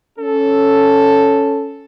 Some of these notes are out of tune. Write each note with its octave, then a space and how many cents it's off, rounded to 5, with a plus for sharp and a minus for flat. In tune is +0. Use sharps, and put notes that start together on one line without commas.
C#4 +0 A4 +0